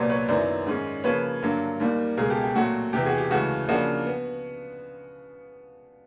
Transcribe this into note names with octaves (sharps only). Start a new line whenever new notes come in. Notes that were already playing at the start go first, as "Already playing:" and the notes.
Already playing: C2 A#2 F#3 B3 C5 D5
B4 C#5
F#2 D#3 F#3 B3 E4 C5 D5
G#2 D#3 G#3 C#4
C#3 F3 A#3 B4 C#5
G2 D3 F#3 A#3
D#2 D#3 G3 A#3
C#2 B2 G#3 G#4 A#4
G4 A4
G4
A#2 F#3 A3 C4 F#4
E2 C3 E3 G4
F#4 G#4
G4
C#2 C#3 E3 A3 F#4
C#3 F3 A#3 D4 F#4
B3